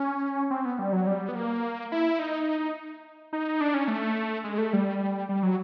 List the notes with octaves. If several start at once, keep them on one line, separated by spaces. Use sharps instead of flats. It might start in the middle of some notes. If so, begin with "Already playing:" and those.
Already playing: C#4
C4
B3
G3
F#3
G3
B3
A#3
E4
D#4
D#4
D4
C#4
A3
G#3
A3
G3
G3
F#3